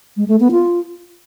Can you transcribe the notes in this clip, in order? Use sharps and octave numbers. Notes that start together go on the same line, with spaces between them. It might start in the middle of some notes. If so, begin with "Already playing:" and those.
G#3
A3
B3
F4